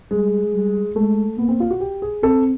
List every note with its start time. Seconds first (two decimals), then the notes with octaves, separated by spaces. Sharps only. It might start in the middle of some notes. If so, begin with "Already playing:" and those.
0.11 G3 G#3
0.53 G3
0.96 G#3 A3
1.38 A#3 B3
1.49 C4
1.60 F4
1.71 F#4
1.80 G4
2.02 G#4
2.23 C4 A4